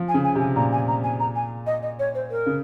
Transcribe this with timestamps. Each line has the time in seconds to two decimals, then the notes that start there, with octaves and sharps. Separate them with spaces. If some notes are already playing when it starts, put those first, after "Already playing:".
Already playing: F3
0.09 G#5
0.14 C#3
0.24 G#5
0.35 C3 G#5
0.56 A#2 A#5
0.72 G#5
0.88 A#5
1.04 G#5
1.20 A#5
1.35 G#5
1.66 D#5
1.82 D#5
1.99 C#5
2.15 C5
2.31 A#4
2.46 C#3